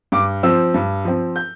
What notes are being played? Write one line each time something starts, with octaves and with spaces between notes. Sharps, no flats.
G2 D6
F3 C4 E6
G2
F3 C4
G6